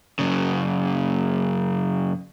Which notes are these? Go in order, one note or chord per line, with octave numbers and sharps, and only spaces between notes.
F#2 C#3